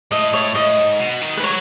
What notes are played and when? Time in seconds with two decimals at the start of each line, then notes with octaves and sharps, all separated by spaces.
0.12 A2 D#5
0.33 A2 C#5
0.55 A2 D#5
0.78 G#2
1.00 B2
1.21 D#3
1.37 E3 B4
1.43 F#3 C#5